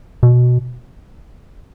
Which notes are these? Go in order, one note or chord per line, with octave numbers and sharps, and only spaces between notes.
B2